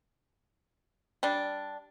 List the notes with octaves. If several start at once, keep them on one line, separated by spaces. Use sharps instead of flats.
G3 D4